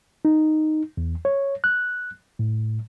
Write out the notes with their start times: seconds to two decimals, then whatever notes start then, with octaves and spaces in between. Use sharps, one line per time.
0.25 D#4
0.97 E2
1.25 C#5
1.64 F#6
2.39 A2